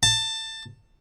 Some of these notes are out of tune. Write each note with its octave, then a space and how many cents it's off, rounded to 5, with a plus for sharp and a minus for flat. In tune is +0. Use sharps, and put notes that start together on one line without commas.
A5 +20